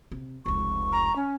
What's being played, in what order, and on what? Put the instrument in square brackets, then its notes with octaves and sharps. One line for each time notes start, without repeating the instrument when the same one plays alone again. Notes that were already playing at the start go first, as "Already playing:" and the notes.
[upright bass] C3
[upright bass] F1 C#2 [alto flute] C#6
[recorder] A#5
C#4